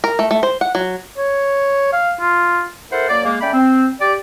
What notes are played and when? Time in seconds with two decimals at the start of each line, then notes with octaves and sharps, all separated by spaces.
0.04 A#4
0.19 A3
0.31 A3
0.43 C5
0.61 F#5
0.75 F#3
1.18 C#5
1.93 F5
2.21 F4
2.91 E4 A4 A#4 C5 F#5
3.09 F#2 A#3 D5
3.25 G#3 A#3
3.41 A3 C#4 D5 G5 B5
3.54 C4
4.01 G4 D5